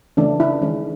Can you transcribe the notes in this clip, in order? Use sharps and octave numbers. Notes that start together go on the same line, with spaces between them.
C#3 E3 A3 C#4 D4
E4
D#3 G#3 C#4